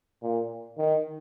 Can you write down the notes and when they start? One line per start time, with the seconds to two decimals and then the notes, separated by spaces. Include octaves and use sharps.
0.22 A#2
0.78 D#3